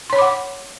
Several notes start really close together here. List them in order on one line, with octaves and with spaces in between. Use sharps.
C6 C#5 B5 D6 F#5